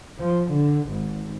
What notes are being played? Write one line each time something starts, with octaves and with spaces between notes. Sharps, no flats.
F3
D3
G#1